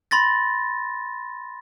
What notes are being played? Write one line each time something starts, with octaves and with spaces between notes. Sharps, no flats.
B5 C6 A6 A#6